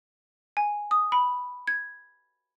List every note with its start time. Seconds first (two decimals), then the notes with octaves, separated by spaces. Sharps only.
0.57 G#5
0.91 D#6
1.12 B5
1.67 G#6